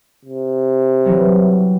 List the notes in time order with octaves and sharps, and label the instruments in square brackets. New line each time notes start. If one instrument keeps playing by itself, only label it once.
[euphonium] C3
[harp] E3 F#3 G3